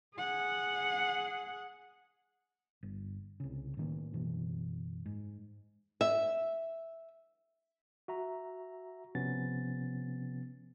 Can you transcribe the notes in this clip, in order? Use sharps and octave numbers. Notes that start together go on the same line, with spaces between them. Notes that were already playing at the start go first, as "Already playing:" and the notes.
G#4 F#5
G1
C2 C#3
A2 D#3 A#3
F#1 B2 E3
G#2
E5
F#4 E5 A#5
C3 F3 B3 C#4 A6